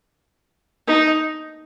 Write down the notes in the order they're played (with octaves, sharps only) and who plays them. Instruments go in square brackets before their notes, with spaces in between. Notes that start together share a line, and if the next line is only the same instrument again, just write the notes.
[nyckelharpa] D#4